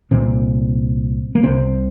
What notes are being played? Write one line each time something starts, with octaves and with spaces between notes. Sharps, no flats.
C2 A#2 C4
A#3
C2 C3 C4